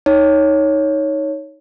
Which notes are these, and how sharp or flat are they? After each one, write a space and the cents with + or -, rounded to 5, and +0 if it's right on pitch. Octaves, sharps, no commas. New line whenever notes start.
D#4 +10 C#5 +0